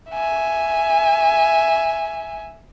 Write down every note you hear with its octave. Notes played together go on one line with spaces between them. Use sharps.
E5 G#5